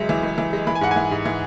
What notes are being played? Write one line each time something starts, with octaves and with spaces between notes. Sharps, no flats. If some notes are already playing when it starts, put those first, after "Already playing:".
Already playing: C#2 F#3 G#3 E5
E3
C#2
E3
G#3
E3 B5
G#5
G#2 F#5
G#5
E3
G#2
E3